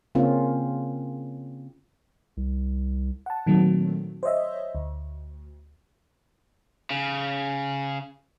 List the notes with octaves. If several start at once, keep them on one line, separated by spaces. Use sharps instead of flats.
C#3 A#3 C4 C#4 F4
C2
F#5 A5
A#2 D#3 F#3 A3 C4
C5 C#5 D#5 E5
D2
C#3